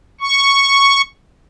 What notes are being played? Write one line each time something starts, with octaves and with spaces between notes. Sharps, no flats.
C#6